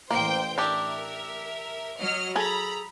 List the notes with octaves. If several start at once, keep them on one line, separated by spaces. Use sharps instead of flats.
A1 A#3 C5 G5
D4 G4 A#4 E5
F#3 D#5 F6
G#4 A4 A#5 B5